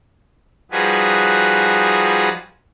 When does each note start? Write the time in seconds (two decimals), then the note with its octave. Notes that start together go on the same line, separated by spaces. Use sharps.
0.71 F3 G3 D#4 F#4 G#4 B4